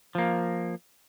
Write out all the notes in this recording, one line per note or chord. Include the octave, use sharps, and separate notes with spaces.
F3 A#3